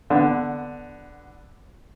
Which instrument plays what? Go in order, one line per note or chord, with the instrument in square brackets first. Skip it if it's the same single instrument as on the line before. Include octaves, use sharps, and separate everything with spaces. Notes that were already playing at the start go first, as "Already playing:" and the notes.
[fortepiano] D3 B3